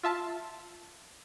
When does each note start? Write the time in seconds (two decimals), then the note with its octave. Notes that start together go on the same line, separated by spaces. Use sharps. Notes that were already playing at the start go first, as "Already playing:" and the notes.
0.03 F4 E5 A5